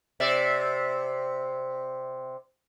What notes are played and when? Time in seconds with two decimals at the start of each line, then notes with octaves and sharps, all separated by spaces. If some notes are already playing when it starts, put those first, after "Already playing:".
0.20 C3 D5 E5